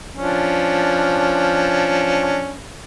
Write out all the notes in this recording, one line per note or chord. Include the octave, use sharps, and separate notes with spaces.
F3 C#4 D4